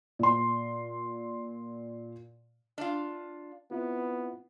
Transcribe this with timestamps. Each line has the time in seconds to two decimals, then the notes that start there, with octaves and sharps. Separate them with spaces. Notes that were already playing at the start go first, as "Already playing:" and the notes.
0.19 A#2 C6
2.78 D4 F4
3.71 B3 C4 E4 F4